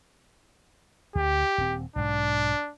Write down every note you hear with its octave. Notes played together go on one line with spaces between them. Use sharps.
D2 G4
D#1 C4
B1 G#2 D4